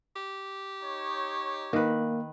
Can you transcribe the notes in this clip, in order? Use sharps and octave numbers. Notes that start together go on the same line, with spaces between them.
G4
D#4 C#5
D#3 A#3 B4